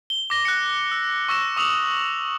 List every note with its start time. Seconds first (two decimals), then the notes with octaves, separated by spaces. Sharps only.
0.10 G7
0.30 D6 A#6 G7
0.45 F#6 A#6 C#7
0.91 E6
1.29 C#6 E6 A#6 E7
1.57 C#6 D#6 E6 F7 F#7